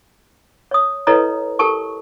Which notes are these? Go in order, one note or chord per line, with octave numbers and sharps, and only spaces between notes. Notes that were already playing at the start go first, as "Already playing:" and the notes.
C#5 D#6
E4 A4 B4 C#5 D#5 A#5
G4 A4 A#4 A5 C#6